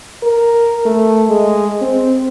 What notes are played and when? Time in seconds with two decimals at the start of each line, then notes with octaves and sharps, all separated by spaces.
0.23 A#4
0.86 A3
1.30 G#3
1.82 C4